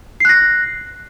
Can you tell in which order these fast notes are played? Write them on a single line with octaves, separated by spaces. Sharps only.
C7 F#6 A#6